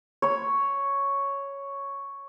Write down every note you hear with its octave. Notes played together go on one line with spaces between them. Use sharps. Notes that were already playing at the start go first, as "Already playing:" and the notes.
C#5 B5